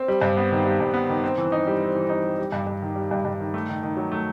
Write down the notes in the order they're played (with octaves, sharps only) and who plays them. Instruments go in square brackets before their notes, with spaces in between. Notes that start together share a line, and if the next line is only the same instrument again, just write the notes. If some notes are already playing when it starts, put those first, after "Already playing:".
Already playing: [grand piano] C4
G3
G2
B3
D#3
G3
G2
B3
D#3
C4
E3
D#4
G3
C4
E3
D#4
G3
G3
G2
G2
D#3
G3
G2
G2
D#3
A3
D#3
D#3
F#3
A3